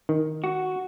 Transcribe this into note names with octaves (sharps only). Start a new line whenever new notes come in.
D#3
F#4